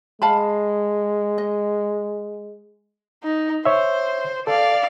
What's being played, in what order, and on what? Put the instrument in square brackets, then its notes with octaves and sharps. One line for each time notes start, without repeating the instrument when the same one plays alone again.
[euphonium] G#3 [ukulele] F5 A5 B5
[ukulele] D#5
[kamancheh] D#4
[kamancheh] C5 [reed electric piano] C#5 E5
[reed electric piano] A4 [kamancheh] D5 F5